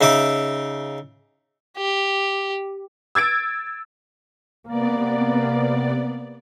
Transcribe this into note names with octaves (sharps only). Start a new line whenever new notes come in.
C#3 D#4 E5 D6
G4
E6 G#6 A6 D7
C3 A#3 B3 D5